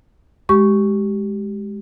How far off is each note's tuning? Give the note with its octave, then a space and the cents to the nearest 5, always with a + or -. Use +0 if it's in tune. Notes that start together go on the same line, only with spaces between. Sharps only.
G#3 +0 G4 -20 C#6 +0